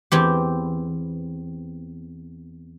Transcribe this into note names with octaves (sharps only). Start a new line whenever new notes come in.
E2 C4 G4